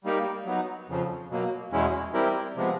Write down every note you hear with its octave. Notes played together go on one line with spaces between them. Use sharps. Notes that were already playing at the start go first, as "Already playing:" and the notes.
G3 A#3 D#4 G4 A#4
F#3 B3 D#4
F2 C#3 F3
B2 F#3 A#3
E2 B2 G#3 C#4 E4
G3 C4 E4 G4 A#4
C3 F3 G#3 B3